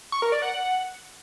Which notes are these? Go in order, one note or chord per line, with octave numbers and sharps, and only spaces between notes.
C#6
A#4
D5
F#5